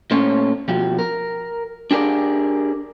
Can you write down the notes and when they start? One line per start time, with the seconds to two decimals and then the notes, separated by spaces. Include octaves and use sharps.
0.11 A#2 A3 C#4 C5 C#5
0.68 B2 F3 F#4 G4
0.99 A#4
1.91 D4 G4 G#4 A#4 D5